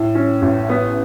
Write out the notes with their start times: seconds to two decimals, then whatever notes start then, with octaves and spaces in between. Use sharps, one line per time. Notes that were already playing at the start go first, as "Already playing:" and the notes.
Already playing: A2
0.15 C#4
0.42 A1
0.69 B3